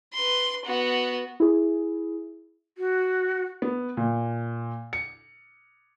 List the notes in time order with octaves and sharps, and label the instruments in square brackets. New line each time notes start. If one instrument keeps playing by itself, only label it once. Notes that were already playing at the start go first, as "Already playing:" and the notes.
[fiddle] B4 C6
B3 F#4
[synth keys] E4 G#4
[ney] F#4
[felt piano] B3
A#2
C#7